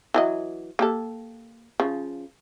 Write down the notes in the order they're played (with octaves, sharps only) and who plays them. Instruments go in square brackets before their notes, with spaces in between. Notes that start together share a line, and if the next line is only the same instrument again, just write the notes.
[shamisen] E3 F#3 D#5
A#3 G4 A4
C#3 F3